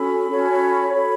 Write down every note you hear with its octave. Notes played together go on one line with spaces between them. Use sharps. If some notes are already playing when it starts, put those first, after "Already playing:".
Already playing: C#4 F#4 A4 B5
C#4 F#4 A4 C#5
F#4 A4 C#5